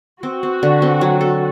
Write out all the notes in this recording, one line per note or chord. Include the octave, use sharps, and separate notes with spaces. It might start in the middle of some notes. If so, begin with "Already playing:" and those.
C4 F#4
C4
D3
C4
F#3
A4